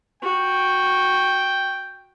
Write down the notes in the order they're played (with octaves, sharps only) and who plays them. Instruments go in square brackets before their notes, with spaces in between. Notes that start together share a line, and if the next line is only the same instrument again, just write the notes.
[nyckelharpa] F#4 [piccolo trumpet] G5